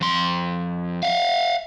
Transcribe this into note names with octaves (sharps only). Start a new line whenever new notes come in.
F2 C6
F5 F#5